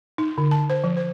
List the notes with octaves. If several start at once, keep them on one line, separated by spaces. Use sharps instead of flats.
D#4
D3
A5
C5
F3
C5